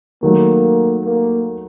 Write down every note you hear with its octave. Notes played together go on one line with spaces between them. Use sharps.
D#3 F#3 A3 A#3
A#3